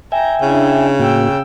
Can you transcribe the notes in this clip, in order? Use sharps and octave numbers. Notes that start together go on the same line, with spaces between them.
E5 G5 G#5 A#5
C#3 D4 E4
A2 A#3 F#4 G5 E6